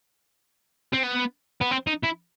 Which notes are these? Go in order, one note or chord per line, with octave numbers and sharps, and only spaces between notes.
C4
B3
B3
C4
D#4
E4